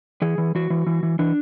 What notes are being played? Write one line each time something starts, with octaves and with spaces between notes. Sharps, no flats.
E3 G#4
E3
E3 F#4
E3
E3
E3
E3 D4